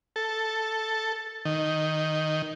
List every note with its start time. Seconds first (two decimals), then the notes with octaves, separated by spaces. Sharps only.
0.16 A4
1.45 D#3